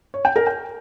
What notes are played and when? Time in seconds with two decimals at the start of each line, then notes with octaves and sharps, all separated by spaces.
0.14 C#5
0.25 G5
0.36 A#4
0.47 G5